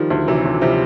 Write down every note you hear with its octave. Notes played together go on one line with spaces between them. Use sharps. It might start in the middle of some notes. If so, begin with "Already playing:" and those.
Already playing: D#3 F3 G3
D2
C3 E3 F#3
D2
C3 F3 G3